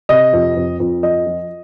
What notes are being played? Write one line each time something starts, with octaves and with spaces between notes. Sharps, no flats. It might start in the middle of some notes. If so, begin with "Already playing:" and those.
C3 D#5
F2
F2
F2
F3 D#5
F3